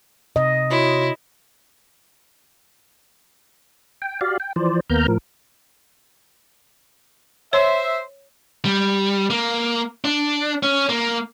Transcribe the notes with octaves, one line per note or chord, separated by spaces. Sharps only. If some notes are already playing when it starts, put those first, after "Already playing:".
C3 D#5
E4 F#4 C#5 C6
G5
F#4 G4 D5 F5
G5
E3 F3 C5 D5
D#2 A#3 B3 A#5 F6 G6
A2 F3 A#4
C5 C#5 E5
G3
A#3
D4
C#4
A#3